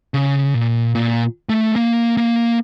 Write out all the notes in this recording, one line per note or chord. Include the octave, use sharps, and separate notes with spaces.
C#3
A#2
A#2
A3
A#3
A#3